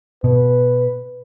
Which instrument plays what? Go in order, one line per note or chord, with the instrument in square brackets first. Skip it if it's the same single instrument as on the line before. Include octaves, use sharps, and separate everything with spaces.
[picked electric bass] B2 [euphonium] B4